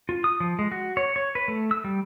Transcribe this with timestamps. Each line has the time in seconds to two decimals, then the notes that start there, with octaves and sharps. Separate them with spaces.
0.09 F4
0.24 D#6
0.40 F3
0.59 G#3
0.72 F#4
0.97 C#5
1.16 C#5
1.35 B4
1.48 A3
1.71 E6
1.84 G3